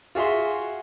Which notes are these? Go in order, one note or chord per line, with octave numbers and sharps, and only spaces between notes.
F4 F#4 G#4 E5 C6